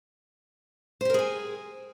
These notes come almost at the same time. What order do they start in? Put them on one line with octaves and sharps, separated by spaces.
C5 G4 A#4 G#4 G#5